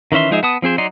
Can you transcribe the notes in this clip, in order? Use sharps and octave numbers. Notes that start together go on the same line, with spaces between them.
D#3 E3 C#4 E5 C6
F3 G#3 D#4 G#4 E5
B3 A5 D#6
F3 C4 G#4 C5
F#3 D#4 D5 C6